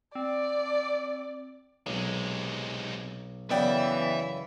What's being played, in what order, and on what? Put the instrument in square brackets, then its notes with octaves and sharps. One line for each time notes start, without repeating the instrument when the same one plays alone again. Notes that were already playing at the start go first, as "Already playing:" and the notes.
[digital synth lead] C4 [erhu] D5
[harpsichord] B1 [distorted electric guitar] C3 G#3
[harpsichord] F#2 C#3 [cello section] E3 [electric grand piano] B3 D5 G5 [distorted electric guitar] E5